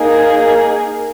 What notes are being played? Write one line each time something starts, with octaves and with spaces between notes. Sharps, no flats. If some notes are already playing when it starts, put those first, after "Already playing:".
Already playing: A#3 D#4 G#4